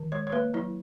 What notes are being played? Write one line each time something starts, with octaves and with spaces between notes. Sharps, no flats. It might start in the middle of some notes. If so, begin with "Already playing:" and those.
Already playing: D#3
G#3 C#5
C#5
A#3 B4
F#3 E4